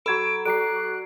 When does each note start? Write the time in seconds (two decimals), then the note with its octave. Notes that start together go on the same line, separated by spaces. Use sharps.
0.06 F#3 A4 B5 C6 E6 G#6 D7
0.45 F#3 A4 D5 A#5 F#6 C7 D7